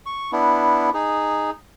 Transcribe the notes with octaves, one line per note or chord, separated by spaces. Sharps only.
C#6
B3 D4 E4
D#4 G#4